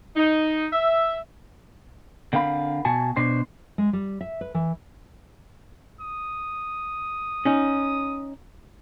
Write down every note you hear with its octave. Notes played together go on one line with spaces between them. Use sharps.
D#4
E5
D3 C4 A#4 F5 B5
B2 F#4 G#5 A5
B2 D4 C5
G#3
G3
E5
B4
E3
D#6
C#4 D#4